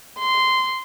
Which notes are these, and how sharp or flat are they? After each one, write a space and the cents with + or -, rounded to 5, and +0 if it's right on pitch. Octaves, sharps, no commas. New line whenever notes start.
C6 -10